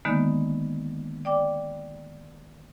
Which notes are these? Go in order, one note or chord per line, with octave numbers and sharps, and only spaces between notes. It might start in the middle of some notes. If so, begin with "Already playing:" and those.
D3 D#3 G#3 A#3 B3 D#4
D5 G5 D6